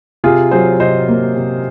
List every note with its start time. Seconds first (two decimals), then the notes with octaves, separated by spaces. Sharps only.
0.24 C3 F4 G#4
0.51 F#3 G#4 C5
0.80 C3 C5 D#5
1.08 A#3
1.36 C3